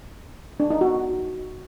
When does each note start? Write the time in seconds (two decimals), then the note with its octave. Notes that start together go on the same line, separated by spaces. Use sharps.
0.60 D4
0.70 D#4
0.81 F#4